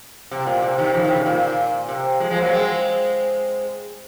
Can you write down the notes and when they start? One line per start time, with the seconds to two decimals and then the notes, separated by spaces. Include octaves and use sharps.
0.31 C3
0.47 A#2
0.62 C3
0.78 C3 D#3
0.94 C#3 F3
1.04 C3 D#3
1.15 C#3
1.26 A#2
1.89 C3
2.20 F3 G#3
2.30 F3 G#3
2.41 F#3 A#3
2.52 G#3 C4